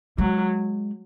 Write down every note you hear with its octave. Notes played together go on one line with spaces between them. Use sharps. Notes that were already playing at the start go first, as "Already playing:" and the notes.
F#3 G#3